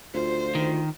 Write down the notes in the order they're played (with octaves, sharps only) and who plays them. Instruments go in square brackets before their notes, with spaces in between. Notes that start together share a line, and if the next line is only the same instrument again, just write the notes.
[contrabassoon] D2 [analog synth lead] F4 [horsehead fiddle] C5
[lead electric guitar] D#3